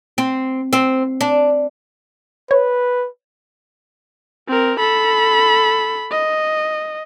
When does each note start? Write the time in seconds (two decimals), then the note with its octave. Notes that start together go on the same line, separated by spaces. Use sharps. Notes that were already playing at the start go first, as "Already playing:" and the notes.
0.18 C4
0.73 C4
1.21 D4
2.51 B4 C#5
4.48 C4 A#4
4.79 A4 B5
6.11 D#5